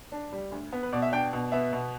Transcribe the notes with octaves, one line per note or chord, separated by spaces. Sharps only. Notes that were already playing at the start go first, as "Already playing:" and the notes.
D4
G3
D2
B3
B4
B2 D5
E5
D4 G5
B2
B3 E5
B2